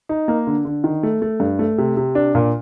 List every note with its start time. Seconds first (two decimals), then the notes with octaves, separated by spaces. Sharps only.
0.09 D#4
0.28 A#3
0.47 D3
0.65 D3
0.84 D#3
1.03 A3
1.22 A3
1.40 G2
1.59 A3
1.78 C3
1.97 C3
2.15 D4
2.35 A#2